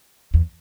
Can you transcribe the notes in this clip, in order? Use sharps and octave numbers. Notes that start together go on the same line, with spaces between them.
E2